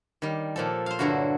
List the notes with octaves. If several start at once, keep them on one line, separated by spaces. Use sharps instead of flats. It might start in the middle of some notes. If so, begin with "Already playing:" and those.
D#3 G3
A#2 F3 A4
C5 F5
G2 D3 F#3 E4 F#4